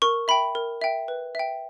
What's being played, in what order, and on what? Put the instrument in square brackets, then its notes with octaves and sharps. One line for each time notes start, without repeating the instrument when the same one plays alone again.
[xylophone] A#4 C#6
E5 G5 B5
A#4
E5 G5
B4
E5 G5